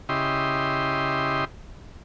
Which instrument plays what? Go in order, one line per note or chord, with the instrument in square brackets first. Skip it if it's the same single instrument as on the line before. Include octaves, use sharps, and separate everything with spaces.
[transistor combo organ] C#3 E4 G4 D#5 C6